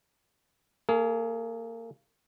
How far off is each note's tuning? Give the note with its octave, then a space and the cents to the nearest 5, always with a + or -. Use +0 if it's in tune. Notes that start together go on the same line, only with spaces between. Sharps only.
A#3 -30 G#4 +20